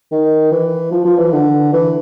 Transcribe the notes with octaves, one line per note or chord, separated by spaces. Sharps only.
D#3
E3
F3
F3
E3
D3
E3